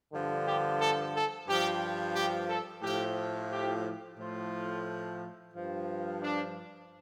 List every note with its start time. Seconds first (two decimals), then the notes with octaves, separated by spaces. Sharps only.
0.12 G2 D3 F3
0.46 G4
0.80 A4
1.15 A4
1.48 G2 F3 G4
2.16 G4
2.49 A4
2.83 A2 F3 G4
3.51 G4
4.18 A2 F3 F4
5.54 G2 F3
6.22 D4